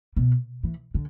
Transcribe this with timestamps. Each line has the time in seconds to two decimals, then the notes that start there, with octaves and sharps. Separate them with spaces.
0.17 B2
0.63 E3
0.94 D3